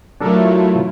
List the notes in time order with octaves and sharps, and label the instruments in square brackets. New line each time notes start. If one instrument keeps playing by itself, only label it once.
[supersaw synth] F#3 A3 [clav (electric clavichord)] D4 A4 A#4 [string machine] E4 F4